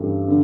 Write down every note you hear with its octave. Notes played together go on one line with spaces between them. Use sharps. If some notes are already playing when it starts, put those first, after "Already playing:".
Already playing: G2 E3 A3 C#4 G4
D3